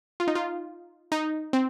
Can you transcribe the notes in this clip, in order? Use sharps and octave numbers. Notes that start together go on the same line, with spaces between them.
F4
D#4
F4
D#4
C4